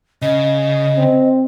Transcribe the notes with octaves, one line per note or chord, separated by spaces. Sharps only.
C#3 D#5
C4